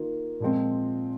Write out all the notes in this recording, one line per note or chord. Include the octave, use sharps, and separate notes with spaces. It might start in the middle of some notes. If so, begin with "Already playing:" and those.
Already playing: D#3 A#3 F4
A#2 F3 G#3 C4 F4